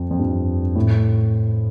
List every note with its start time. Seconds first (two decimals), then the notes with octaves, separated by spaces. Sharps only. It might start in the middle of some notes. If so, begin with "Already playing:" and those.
Already playing: F2
0.11 F2
0.20 G2
0.75 A2